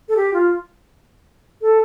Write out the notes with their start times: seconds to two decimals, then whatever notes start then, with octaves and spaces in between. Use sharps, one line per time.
0.09 A4
0.16 G4
0.33 F4
1.62 A4